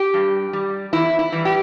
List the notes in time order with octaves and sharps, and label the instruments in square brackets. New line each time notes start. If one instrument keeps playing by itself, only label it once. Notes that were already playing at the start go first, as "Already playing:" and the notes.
Already playing: [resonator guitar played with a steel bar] G4
G2
G3
E2 E4
E4
E3 G3
G4